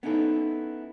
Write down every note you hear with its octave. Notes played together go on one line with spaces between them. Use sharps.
B3 C#4 D#4 E4 A4